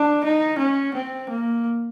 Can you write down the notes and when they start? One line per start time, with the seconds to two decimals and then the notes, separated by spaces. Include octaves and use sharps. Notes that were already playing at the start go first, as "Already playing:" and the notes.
Already playing: D4
0.24 D#4
0.58 C#4
0.94 C4
1.29 A#3